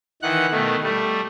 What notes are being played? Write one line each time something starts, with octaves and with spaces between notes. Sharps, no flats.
D#3 E3 F#5 F#6
B2 D#3 A3
G3 A3